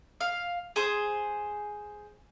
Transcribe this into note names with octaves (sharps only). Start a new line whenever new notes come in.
F5
G#4 C5